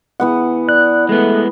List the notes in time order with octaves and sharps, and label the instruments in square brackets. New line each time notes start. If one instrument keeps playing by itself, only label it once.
[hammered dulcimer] E3 B3 F#5
[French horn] D5 [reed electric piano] F#6
[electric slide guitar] G#3 B3 [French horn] A3